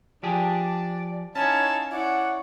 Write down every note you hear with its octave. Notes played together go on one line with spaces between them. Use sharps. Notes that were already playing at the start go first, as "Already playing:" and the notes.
F3 D4 G4 G#4 D5
C#4 D#4 E4 C#5 F5 A5
E4 C#5 D5 F#5